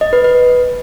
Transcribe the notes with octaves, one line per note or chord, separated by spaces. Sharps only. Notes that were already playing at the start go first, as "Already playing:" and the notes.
D#5
B4
B4